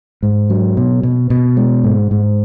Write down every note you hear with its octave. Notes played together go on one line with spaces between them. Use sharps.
G#2
F#3
B2
B2
B2
G#3
G#2
G#2